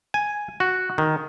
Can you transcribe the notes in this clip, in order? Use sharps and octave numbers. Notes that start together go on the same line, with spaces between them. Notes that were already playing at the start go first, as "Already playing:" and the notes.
G#5
F#4
D#3